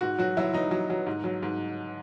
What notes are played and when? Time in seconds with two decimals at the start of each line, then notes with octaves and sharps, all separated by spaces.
0.01 G#2 F#4
0.18 F#3 F#4
0.37 F#3 E4
0.53 F#3 D#4
0.71 F#3
0.90 F#3
1.07 G#2
1.24 F#3
1.43 G#2